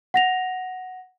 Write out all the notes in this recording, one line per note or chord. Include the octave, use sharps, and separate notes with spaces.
F#5 A#6 F7